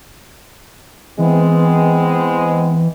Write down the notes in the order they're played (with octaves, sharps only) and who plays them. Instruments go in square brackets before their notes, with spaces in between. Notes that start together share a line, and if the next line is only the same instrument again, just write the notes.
[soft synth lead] E3 [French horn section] G#3 B3 C4